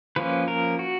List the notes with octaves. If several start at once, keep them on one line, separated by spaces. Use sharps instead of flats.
F3 A#3 C#4 B4
A#4
F#4